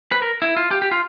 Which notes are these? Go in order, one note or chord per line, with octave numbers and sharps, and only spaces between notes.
B4
A#4
E4
F4
G4
G4
F4